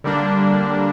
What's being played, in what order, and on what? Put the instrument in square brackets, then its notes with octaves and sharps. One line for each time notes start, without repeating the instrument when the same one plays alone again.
[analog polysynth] D3 G3 A#3 D4